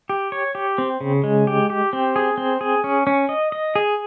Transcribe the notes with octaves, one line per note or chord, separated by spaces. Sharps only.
G4
C#5
G4
C4
C#3
G#3
G4
G4
C4
G#4
C4
G#4
C#4
C#4
D#5
D#5
G#4